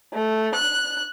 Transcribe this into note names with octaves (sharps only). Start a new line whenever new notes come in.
A3
F#6